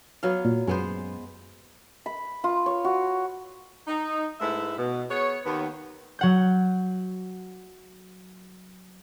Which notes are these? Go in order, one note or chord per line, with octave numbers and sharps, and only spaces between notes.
F#3 B3 F5
A#2
F#2 G#3 B3 C5
B5
F4
C#5
F#4
D#4
G#2 A3 E4 B4 E5
B2
B3 G#4 C#5
D#2 B3
F#3 F#5 G6